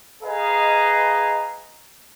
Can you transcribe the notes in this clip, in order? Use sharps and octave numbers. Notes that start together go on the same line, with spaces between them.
G#4 B4 D#5 F5 A#5